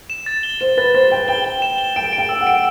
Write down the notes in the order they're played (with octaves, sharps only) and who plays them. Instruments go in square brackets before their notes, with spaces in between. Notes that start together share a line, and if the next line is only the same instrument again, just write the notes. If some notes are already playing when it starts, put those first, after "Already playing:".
[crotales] E7
A6
G7
[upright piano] C5 [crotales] E7
[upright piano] B4 [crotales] A6
[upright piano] C5 [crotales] A6
[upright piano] G5 [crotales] A6
[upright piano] G5 [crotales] G7
[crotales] G7
E7
G7
[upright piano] G5 [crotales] D7
[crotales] D7
[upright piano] G5
[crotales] E6
[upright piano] F#5
[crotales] D7